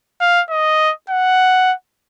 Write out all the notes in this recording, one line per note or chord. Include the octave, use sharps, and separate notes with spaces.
F5
D#5
F#5